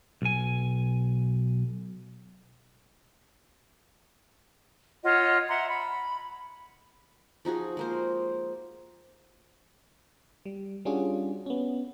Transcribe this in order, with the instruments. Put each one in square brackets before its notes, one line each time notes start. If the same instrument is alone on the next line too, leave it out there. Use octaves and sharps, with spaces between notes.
[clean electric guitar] B1 G#5
[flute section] F4 C#5 D#5 F#5
E5 F#5 A#5 C6
B5
[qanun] F3 D#4 F#4 G#4
G#3 A#3 C5
[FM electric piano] G3
G3 C#4 D4 F4 F#4 G#4
B3 C#4